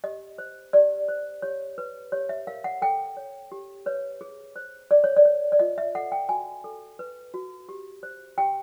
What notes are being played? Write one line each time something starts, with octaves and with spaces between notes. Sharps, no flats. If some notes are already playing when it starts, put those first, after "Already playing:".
G4 D#5
C5
G4 D5
C5
G4 C#5
B4
G4 C#5
E5
A#4 F5
F#5
A4 G5
C#5
G4
B4 C#5
G#4
C5
G#4 D5
C#5
D5
C#5
D5
F4 D#5
E5
A4 F#5
G5
F#4 G#5
A4
B4
F#4
G4
C5
G4 G5